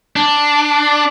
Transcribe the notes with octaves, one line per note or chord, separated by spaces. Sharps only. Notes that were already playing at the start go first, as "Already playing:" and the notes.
D4